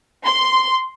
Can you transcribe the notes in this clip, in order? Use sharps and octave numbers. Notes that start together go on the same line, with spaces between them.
C6